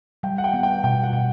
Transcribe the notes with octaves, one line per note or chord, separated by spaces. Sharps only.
G3 G5
F#5
G5
B3
G5
B2 G5
F#5
B2